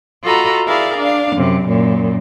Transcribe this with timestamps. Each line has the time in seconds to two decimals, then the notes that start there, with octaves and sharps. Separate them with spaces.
0.23 F4 F#4 A4 D#5 A#5 B5
0.67 E4 G#4 A#4 D5 F5
0.98 D4 F5
1.36 F#2 C3
1.65 F#2 A#2